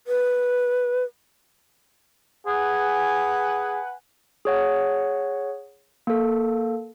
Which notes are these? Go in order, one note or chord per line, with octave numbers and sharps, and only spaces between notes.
B4
G#4 B4 F#5 G#5
G#4 C#5 F#5
A#3 A4